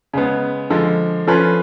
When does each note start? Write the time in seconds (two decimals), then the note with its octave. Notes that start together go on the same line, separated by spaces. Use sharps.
0.14 C#3 G#3 B3
0.70 D3 F3 G#3
1.27 F3 A3 C#4 F4 B4